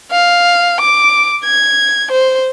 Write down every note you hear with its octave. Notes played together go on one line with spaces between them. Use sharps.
F5
D6
G#6
C5